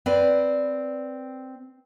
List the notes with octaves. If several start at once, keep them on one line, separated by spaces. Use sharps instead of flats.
C4 B4 D5